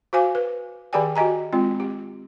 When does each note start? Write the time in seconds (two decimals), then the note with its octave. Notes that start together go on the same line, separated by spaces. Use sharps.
0.13 F#4 C5 F5 G#5 D6
0.35 B4
0.93 D#3 G4 G#4 D5 G5 G#5
1.16 F#4 G4 D#5 G#5 A#5
1.53 G#3 C4 F4
1.80 G4